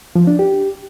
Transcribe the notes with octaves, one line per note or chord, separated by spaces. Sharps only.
F3
D4
G4